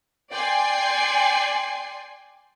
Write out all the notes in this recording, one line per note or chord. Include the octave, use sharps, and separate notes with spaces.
D5 G5 G#5 C6 C7